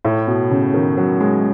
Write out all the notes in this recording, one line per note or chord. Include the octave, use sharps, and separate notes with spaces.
A2
B2
C#3
D#3
F#3
G#3